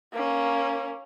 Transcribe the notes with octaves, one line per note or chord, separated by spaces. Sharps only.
A#3 C#4